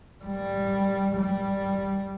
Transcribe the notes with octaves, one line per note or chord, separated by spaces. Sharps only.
G3
G3